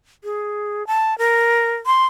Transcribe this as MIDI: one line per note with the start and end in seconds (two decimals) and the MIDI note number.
0.24 0.86 68
0.87 1.17 81
1.18 1.76 70
1.86 2.06 84